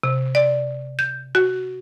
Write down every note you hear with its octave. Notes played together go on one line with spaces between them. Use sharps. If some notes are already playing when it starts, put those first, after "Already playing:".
C3
D5
G6
F#4